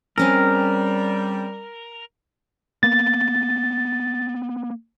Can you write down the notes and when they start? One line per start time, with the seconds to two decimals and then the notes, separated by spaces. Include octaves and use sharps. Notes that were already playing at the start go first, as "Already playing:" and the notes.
0.18 G3 C4 C#4 G#4 A#4
2.83 A#3 B3 A6